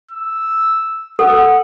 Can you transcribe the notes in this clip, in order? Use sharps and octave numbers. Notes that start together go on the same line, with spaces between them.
E6
A4 F#5 E6